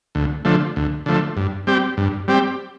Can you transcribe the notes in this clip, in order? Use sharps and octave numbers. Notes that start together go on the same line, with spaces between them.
D2
D3 F3 A3
D2
D3 F3 A3
G2
G3 C4 G4
G2
G3 C4 G4